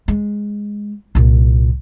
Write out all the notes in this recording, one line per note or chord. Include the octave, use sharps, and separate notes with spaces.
G#3
C2 A#2